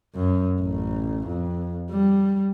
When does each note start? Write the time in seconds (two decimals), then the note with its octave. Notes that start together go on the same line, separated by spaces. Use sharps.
0.15 F#2
0.60 A1
1.27 F2
1.91 G3